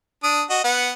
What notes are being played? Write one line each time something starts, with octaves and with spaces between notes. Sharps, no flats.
D4 D#6
F#4 D#5
B3 F#5